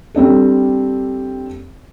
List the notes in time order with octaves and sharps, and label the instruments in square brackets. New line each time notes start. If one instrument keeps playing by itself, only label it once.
[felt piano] G3 C4 D4 A4